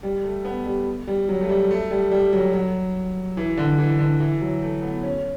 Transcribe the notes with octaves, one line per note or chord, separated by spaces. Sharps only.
G3
A3
B3
G3
G3
F#3
A3
G3
A3
G3
G3
F#3
F#3
E3
D3
E3
D3
E3
F#3
A3
B3
C#4